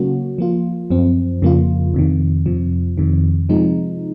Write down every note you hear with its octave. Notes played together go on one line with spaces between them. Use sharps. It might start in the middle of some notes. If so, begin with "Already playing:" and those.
Already playing: C#3 F#3 A#3 C#4 F#4
F3 A#3 F4
F#2 F3 C4
F2 C#3 F3 A#3 F4
F2 C3 D#3
F2 C3 F3
F2 C3 D#3
C3 F3 G#3 D#4